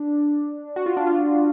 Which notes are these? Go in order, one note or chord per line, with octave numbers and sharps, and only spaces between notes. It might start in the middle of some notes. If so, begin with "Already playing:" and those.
Already playing: D4
F#4
F4
D4
F4